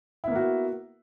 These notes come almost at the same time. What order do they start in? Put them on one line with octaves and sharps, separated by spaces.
E4 B3 A#3 F#4